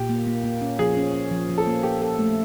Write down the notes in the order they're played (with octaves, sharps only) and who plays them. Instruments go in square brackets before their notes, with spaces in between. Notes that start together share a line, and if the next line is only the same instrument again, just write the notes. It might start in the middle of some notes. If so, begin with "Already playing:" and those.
Already playing: [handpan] A#2 [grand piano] G4
[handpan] A#3
A#3
A#3
C#4
[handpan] F3 [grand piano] G#4
[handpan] C#4
C#4
F3
F3
[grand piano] A4
[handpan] A#3
[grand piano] G4 [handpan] A4
[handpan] A4
A3